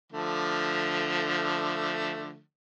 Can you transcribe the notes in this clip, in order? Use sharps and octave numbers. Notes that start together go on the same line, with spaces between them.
D3 F3 A3